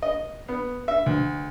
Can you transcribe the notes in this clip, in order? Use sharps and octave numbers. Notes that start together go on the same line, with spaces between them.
D#5
B3
E5
D2